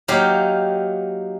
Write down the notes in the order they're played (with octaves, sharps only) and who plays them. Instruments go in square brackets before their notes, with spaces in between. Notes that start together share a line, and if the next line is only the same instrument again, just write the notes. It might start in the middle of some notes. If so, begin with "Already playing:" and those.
[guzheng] F#3 A#3 D#4 G4 F5